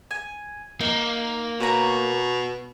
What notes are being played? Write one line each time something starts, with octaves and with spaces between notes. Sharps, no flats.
G#5
A#3 D#4
B2 C#5 A#5